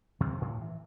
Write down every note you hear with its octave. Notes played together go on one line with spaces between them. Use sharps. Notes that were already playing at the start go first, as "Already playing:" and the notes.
D#2 C3 D#3 C4
D2 A2
E3